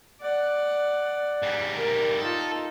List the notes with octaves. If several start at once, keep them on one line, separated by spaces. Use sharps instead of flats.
D5 F#5
G#2 G3
A#4
D#4 F4 A4